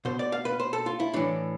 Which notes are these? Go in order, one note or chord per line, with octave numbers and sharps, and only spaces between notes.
B2 C5
D5
F5
B4
C5
A4
F4
E4
A2 E3 D4